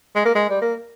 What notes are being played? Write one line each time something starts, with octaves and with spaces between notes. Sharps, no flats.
G#3
A#3
G#3
G3
A#3